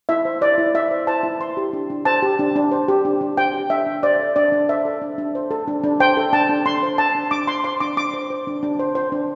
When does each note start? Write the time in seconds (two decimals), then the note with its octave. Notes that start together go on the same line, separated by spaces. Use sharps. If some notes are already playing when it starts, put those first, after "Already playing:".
0.09 E4 E5
0.25 C5
0.41 C5 D5
0.58 E4
0.75 E4 E5
0.91 C5
1.07 C5 A5
1.23 E4
1.40 C5 C6
1.57 G4
1.73 D4
1.90 D4
2.05 C5 A5
2.22 G4
2.39 D4
2.56 D4
2.72 C5
2.88 G4
3.05 D4
3.21 D4
3.37 C5 G5
3.54 G4
3.70 D4 E5
3.87 D4
4.03 C5 D5
4.20 A4
4.36 D4 D5
4.52 D4
4.69 C5 E5
4.85 A4
5.02 D4
5.18 D4
5.35 C5
5.51 A4
5.68 D4
5.83 D4
6.00 C5 G5
6.17 A4
6.33 D4 A5
6.49 D4
6.66 D4 C6
6.83 C5
6.98 C5 A5
7.15 D4
7.31 D4 D6
7.47 C5 C6
7.64 C5 C6
7.80 D4 D6
7.97 D4 D6
8.14 C5
8.30 C5
8.47 D4
8.63 D4
8.79 C5
8.95 C5
9.12 D4